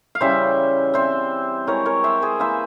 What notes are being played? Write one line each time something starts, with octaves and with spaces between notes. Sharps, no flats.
F5
C#3 E3 G3 C5 E5
E3 G3 C4 E4 C5 E5
E3 G#3 C4 E4 A#4 C#5
A#4 C#5
C5 E5
G#4 C5
E3 A#3 E4 C5 E5